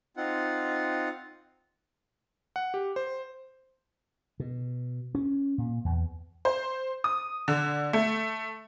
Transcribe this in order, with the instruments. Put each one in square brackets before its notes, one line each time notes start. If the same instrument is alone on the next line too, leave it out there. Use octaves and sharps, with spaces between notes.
[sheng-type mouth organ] C4 D#4 F4 F#5
[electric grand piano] F#5
G4
C5
[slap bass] B2
C#4
A#2
E2
[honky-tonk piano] C5
D#6
D3
A3